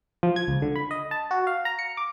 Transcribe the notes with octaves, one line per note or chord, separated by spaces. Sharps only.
F3
G#6
C#2
D3
B5
D#5
A5
F#4
F5
A#5
C#7
D6